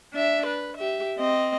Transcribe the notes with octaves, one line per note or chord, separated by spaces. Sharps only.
D4 E5
B4
G4 E5
C4 D#5